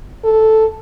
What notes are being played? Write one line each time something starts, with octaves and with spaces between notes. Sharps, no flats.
A4